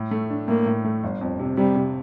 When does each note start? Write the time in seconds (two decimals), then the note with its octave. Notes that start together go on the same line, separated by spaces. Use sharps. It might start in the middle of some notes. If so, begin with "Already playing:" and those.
Already playing: A2
0.11 A3
0.30 D4
0.48 A2 A#3
0.66 A2
0.84 A3
1.03 G1
1.21 F2
1.39 C3
1.57 C3 G3
1.76 C3